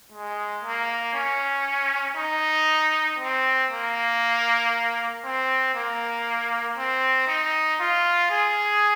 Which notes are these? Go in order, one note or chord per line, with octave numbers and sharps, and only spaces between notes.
G#3
A#3
C#4
D#4
C4
A#3
C4
A#3
C4
D#4
F4
G#4